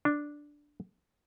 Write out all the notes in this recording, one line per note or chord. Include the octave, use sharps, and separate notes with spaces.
D4